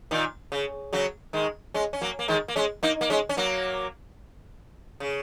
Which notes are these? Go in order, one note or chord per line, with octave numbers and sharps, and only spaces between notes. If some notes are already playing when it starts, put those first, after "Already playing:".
A#2 D#3
C#3
C#3 F#3
D#3 G#3
G#3 C#4
C#4
F#3 A#3
A#3
D#3 G#3
A#3
G#3 C#4
A#3 D#4
A#3
G#3 C#4
C#4
F#3 A#3
C#3